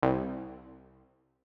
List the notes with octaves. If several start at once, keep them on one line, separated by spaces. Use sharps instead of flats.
C2